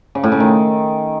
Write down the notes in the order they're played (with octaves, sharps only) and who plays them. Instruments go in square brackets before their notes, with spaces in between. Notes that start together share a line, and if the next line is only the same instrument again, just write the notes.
[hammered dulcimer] C#3
A2
C#3
D#3